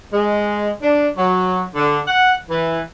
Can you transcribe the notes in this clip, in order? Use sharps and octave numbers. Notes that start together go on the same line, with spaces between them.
G#3
D4
F#3
D3
F#5
E3